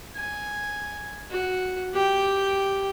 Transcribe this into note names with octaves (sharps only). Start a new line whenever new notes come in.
G#5
F#4
G4 G5